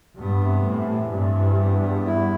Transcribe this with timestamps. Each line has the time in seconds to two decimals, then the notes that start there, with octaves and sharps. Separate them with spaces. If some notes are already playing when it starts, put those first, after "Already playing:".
0.19 G2 B3
0.43 C3
0.65 A2 E3
0.89 C3
1.12 G2 C3
1.35 E3
1.60 B3
1.83 E2
2.07 E4